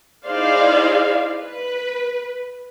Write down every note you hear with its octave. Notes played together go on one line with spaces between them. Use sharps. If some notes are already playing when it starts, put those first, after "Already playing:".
D#4 E4 G#4 C5 D5 F5
B4